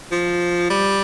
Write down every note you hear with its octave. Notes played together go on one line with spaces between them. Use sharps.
F3
G3